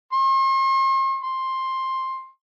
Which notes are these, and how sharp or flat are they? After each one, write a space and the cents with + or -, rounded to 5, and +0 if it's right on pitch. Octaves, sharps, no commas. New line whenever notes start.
C6 +45
C6 +10